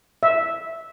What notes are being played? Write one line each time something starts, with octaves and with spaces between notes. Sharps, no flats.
E5